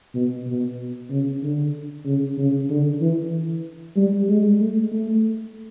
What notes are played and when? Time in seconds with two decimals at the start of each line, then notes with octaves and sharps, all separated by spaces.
0.14 B2
0.47 B2
1.10 C#3
1.42 D3
2.05 C#3
2.38 C#3
2.69 D3
3.01 E3
3.96 G3
4.29 G#3
4.60 A3
4.92 A3